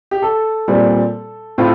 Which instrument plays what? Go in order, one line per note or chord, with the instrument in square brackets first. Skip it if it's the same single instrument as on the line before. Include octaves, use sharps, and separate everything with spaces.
[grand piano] G4
A4
A#2 G3 C4
A2 A3 C4 F4